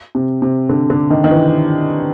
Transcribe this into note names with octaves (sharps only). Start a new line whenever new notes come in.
C3
C3
D3
D3
D#3
D#3
E3